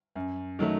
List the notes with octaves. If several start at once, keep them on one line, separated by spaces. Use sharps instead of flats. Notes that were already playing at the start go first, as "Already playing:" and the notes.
F#2
D#3 F#3 A3